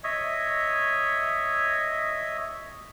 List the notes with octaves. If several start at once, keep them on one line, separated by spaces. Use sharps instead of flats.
C#5 D#5 E5